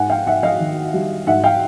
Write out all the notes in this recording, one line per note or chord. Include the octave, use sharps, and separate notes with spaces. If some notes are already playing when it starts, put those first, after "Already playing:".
Already playing: G#2 F#5 G#5
F5 G5
G#2 E5 F#5
D#5 F5
D#3
G3
G#2 E5 F#5
F5 G5